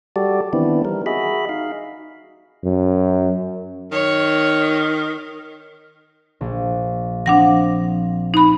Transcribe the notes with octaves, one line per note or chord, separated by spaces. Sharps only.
G3 F#4 G4 A4 D5
D#3 E3 B3 C4 D4 E4
G3 A#4
F#4 G#4 D#5 E5 B5
D#4 F5
F#2
D#3 C#5
A#1
F3 C4 D4 F#5 A#6
D#4 B5